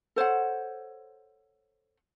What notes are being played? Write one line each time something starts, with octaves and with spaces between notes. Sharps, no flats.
A4 C5 C#5 F#5